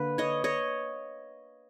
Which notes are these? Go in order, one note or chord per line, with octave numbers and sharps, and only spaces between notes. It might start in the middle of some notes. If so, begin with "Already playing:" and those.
Already playing: D3 A#3 B4
C#5 D#5
C#5 D#5